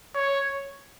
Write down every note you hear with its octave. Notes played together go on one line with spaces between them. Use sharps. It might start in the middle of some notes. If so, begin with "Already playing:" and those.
C#5